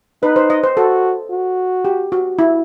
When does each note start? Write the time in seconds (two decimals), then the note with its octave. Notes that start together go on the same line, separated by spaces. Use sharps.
0.23 D#4 B4
0.36 C5
0.50 D#5
0.63 C5
0.77 F#4 A4
1.30 F#4
1.85 G4
2.12 F#4
2.39 E4